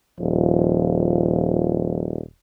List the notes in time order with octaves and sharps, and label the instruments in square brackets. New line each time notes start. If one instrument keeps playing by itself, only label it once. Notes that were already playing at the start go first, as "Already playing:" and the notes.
[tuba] D#1 [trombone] F3